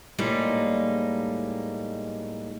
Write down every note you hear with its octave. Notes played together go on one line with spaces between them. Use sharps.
A2 G3 G#3 A#3 D#4